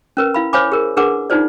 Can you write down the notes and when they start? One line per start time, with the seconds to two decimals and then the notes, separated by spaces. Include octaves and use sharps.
0.17 C#4 A#4 B4
0.34 E4 F5 B5
0.53 C5 C#5 F5 G#5 B5 D6
0.72 G#4 A#4
0.97 D4 G#4 A#4 B4 F#5 D6
1.30 D4 D#4 F4 C5 D5